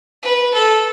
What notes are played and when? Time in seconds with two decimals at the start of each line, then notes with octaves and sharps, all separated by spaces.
0.22 B4
0.54 A4